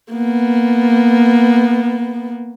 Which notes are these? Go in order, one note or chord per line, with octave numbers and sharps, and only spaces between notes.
A#3 B3